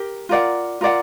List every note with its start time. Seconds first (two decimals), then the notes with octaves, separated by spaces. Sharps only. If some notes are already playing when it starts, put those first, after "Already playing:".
Already playing: G4 A#4
0.29 F4 A#4 D5 F#5
0.81 F4 A#4 D5 F#5